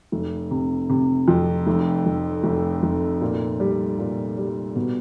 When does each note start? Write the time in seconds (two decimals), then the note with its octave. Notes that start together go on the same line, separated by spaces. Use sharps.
0.12 F1
0.51 C3
0.90 C3
1.28 F2
1.67 F1
2.06 F1
2.43 F1
2.83 F1
3.21 A#2
3.60 G3
3.98 A#2
4.38 G3
4.76 B2